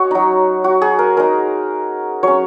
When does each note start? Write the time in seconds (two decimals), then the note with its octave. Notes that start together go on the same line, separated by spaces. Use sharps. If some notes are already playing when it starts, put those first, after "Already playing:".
Already playing: C#4 F#4 C#5 D#5
0.11 F#3 D#4
0.64 F#4
0.82 G#4
0.99 A#4
1.17 G#3 D#4 A#4
2.23 F#3 C#4 C#5